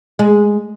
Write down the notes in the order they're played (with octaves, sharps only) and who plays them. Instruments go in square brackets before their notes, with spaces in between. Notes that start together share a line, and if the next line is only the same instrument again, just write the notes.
[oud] G#3